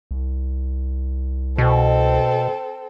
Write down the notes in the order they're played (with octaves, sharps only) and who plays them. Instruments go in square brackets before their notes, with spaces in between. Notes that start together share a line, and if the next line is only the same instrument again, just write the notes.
[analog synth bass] C2
[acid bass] B2 [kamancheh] C4 A4